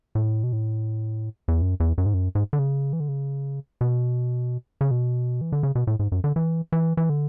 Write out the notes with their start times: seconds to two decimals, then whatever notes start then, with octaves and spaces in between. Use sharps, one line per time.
0.15 A2
0.43 B2
0.53 A2
1.48 E2
1.62 F#2
1.80 E2
1.98 F#2
2.06 G#2
2.14 F#2
2.35 G#2
2.53 D3
2.59 C#3
2.93 E3
3.00 D3
3.08 C#3
3.81 B2
4.81 C#3
4.91 B2
5.41 E3
5.52 D3
5.63 C#3
5.75 B2
5.87 A2
5.99 G#2
6.12 F#2
6.24 D3
6.36 E3
6.72 E3
6.97 E3
7.10 D3